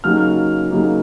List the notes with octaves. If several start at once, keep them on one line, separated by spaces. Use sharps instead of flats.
C#3 F#3 A#3 D#4 F6
C#3 F#3 A#3 D#4